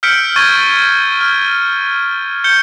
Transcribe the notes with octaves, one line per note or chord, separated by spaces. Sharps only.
E6 F6 G6 B6 C#7 D7
C#6 G#6 A6 D#7 G7
F6
G6 C#7 G7